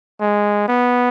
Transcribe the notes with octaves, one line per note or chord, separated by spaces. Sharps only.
G#3
B3